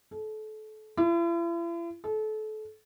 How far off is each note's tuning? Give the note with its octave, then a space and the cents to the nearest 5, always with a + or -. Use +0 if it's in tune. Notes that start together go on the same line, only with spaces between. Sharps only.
A4 -30
E4 +45
A4 -30